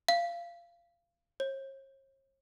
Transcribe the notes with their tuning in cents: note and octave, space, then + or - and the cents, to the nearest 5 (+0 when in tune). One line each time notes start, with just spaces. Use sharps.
F5 -20
C#5 -45